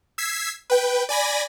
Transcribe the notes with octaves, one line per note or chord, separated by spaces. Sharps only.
E6 G#6 B6 C7
B4 G5
D5 G#5 B5 A#6